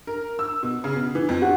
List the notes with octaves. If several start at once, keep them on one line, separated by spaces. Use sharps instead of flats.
A#4
E6
B2
C#3
B2
E3
F2
F#4